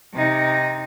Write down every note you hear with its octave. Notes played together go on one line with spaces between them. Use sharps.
C3 D#4